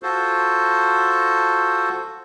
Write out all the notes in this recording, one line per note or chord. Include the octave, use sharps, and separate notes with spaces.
F4 F#4 A4 C5